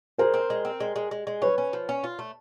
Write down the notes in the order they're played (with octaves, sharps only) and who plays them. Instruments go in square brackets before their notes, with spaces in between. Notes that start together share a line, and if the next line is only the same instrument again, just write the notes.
[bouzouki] G#3 [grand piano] A#4 C5
[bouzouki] C4
G#3
C4
G#3
G#3
G#3
G#3
[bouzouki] C#4 [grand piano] B4 C#5
[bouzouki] C#4
F3
C#4
F4
A3